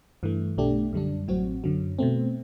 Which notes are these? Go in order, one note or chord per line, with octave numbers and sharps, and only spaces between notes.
G2 E3 A3
B1 B2 A3 D4 G4
F#2 D3 G3 D4
A1 A2 F#3 C4 F#4
F#2 D3 F#3
B2 A3 C4